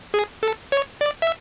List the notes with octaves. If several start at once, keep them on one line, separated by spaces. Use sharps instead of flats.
G#4
A4
C#5
D5
E5